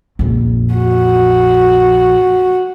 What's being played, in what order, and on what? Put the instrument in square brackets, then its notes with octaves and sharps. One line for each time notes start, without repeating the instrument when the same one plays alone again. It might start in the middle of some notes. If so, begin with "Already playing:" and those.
[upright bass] A#1 F2
[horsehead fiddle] F#4